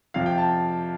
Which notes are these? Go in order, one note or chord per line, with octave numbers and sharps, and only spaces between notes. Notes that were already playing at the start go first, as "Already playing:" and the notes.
F2 C3 F3 F5
G5
A5